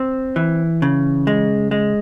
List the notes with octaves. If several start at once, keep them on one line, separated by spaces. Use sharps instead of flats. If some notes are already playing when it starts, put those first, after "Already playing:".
Already playing: C4
E3
C#3
G#3
G#3